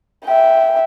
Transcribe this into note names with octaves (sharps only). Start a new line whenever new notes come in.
E5 G5